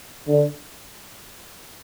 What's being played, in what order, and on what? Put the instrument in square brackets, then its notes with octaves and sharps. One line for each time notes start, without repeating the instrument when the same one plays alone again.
[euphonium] D3